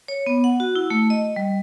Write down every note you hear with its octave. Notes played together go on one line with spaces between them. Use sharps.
C#5
B3
F#5
F#4
E4
A3
D#5
G3